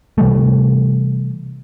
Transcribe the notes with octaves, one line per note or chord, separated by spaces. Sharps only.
C3 E3 G3 A3